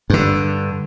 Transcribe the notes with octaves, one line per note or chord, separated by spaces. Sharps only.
G2 D3